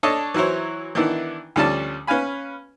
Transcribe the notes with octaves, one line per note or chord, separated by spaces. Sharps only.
D4 A4 C#5 D#5
E3 F#3 E4 C5 C#5
D#3 E3 B3 D4 E4
D2 F3 G3 C#4 D5 A5
C#4 B4 F5 G#5 B5